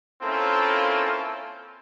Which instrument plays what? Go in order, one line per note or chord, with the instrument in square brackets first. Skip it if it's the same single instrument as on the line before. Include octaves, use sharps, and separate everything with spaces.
[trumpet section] A#3 C4 C#4 E4 F4 A4